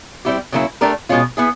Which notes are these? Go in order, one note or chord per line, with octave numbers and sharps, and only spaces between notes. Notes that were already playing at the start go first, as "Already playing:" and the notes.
G3 C4 E4 G4
C#3 F#3 A#3 C#4 E4
A3 D4 G4 A#4
B2 G#3 C#4 F4
B3 E4 G#4